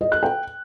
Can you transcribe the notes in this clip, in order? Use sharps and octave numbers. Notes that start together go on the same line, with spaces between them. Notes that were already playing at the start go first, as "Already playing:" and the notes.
D#5
F#6
G5